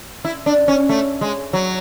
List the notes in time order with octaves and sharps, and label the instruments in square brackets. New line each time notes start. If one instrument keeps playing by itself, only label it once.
[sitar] E4
D4
C#4
A3
G#3
F#3